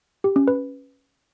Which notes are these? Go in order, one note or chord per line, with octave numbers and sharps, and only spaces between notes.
G4
C#4
B4